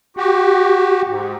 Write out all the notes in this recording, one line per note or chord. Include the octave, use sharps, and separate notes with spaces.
F#4 G4
G#2